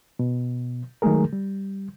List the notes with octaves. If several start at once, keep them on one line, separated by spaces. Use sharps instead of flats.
B2
D#3 F#3 G#3 A3 G#4 A#4
G3